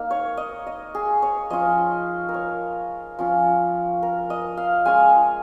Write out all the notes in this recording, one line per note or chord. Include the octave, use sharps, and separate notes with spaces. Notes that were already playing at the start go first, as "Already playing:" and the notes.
Already playing: A#3 D#4
C#5
D#5
D#5
G#4
C#5
F3 C#4 F4 D#5
A#4
C#5
F3 C#4 F4
A#4
D#5
F5
G#3 C#4 F4 G#5